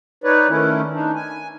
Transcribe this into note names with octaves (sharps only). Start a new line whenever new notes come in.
D#4 B4 C#5 D5
D#3 A3 C#4 E4
D4 D#4
G#5